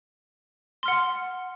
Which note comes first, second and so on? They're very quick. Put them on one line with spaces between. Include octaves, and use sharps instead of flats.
C6 F6 F#5